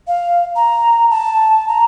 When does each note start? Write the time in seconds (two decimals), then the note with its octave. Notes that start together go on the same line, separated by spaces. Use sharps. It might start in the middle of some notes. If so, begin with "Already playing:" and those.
0.08 F5
0.56 A#5
1.11 A5
1.68 A#5